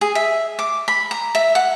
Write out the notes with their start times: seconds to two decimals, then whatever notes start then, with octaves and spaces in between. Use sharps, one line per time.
0.01 G#4
0.15 E5
0.59 D6
0.88 B5
1.11 A#5
1.35 E5
1.55 F#5